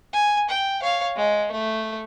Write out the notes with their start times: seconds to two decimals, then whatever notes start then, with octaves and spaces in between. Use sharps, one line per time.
0.13 G#5
0.49 G5
0.82 C#5 F5
1.16 G#3
1.52 A3